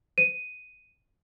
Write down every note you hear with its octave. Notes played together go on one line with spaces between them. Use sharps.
D#7